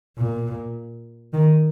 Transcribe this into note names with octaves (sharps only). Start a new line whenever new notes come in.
A#2
D#3